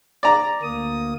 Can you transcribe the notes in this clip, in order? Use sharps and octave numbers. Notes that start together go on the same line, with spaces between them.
D5 A#5
D2 A#3 D#6